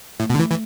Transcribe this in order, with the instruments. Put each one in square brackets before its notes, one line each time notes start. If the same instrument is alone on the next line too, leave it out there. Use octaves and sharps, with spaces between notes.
[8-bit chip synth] A2 [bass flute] A3
[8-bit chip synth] B2
D3
E3
E3